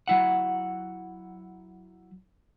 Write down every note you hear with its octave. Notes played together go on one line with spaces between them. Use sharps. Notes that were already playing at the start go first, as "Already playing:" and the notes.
F#3 E4 F#5